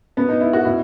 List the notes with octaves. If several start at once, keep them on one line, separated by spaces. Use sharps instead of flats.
B2 B3
D#4
E4
F#4
B2 E4